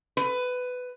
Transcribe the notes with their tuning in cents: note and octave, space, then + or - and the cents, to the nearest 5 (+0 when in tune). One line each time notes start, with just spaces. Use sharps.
B4 +15